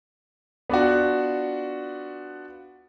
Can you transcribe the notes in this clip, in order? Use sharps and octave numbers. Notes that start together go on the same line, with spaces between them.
B3 D4 F4 F#4